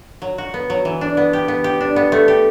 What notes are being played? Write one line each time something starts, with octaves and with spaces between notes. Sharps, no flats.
F#3
F#4
B3
F#3
E3
D4
B3
G4
B3
G4
D4
B3
A3
G4